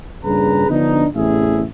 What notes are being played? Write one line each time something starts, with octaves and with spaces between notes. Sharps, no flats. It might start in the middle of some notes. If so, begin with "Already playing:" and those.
G2 A#2 C#3 G#4 B4 A#5
D3 F3 B3 D4 D#4
A1 E2 A2 C3 G#4 E5